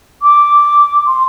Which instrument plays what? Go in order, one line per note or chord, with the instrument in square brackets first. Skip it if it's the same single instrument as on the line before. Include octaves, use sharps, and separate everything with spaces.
[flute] D6
C6